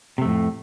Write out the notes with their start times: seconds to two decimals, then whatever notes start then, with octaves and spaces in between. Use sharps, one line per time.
0.18 C3
0.22 A3
0.25 F2
0.28 A2